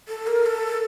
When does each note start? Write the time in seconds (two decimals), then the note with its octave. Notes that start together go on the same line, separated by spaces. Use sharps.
0.08 A4
0.27 A#4
0.46 A4
0.71 A4